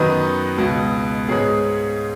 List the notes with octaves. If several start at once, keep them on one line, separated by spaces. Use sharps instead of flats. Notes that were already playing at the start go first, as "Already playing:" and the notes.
Already playing: F#2 D#3 B3 B4 D#5
C#2 B2 B3
G#2 G#3 B3 G#4 C#5